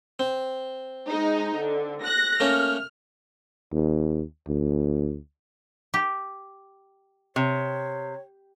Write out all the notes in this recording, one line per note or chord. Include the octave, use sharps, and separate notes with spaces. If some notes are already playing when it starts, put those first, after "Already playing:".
C4
G#3 D#4
D3
F#6 A#6
A3 A#3 C#4 F6
D#2
D2
G4
C3 C#5